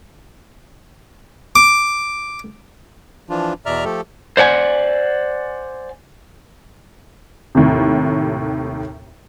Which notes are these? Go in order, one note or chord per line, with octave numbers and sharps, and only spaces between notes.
D6
E3 F3 D4 F4
E2 B2 D5 E5 A#5 F6
F3 A3 G4 A4
C5 D5 F#5 G#5
D#2 A2 C3